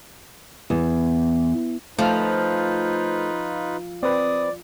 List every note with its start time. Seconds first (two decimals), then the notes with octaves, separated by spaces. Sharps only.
0.70 E2
1.98 F3 A3 D#4 F4 B4 C5 F6
4.03 C4 B4 D5 D#6